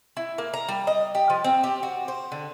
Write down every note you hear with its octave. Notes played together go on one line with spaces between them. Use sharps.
E4
A#3
A#5
G3
D#5
G4
F3
C4
G4
F#4
C5
D3